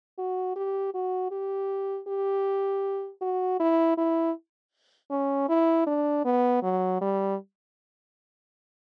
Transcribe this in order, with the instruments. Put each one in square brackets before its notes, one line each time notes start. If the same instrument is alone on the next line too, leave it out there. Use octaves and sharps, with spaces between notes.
[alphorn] F#4
G4
F#4
G4
G4
F#4
E4
E4
C#4
E4
D4
B3
F#3
G3